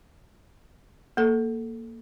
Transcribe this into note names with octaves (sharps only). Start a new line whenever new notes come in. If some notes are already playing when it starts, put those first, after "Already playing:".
A#3 A4